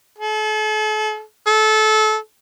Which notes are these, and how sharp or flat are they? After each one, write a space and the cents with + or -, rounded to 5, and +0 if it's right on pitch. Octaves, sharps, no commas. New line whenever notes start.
A4 -40
A4 -25